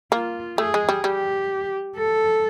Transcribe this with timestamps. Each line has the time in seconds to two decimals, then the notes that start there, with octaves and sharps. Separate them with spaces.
0.12 A#3 F4
0.58 A3 G#4
0.74 G#3
0.89 G3
1.04 G3 G4
1.97 A4